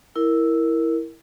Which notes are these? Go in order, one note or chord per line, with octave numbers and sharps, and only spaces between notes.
E4 A#4